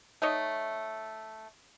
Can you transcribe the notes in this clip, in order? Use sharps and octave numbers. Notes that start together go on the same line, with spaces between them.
A3 D#4 C#5 D#5